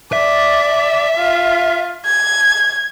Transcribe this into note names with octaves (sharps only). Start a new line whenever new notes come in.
D5 E5
F4
G#6